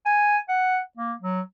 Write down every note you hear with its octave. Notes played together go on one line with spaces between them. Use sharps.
G#5
F#5
A#3
F#3